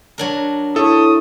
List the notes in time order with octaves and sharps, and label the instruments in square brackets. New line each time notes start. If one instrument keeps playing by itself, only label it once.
[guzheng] F#3 D4 A#4
[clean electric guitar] E4 C#5 [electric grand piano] A4 [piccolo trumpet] D#6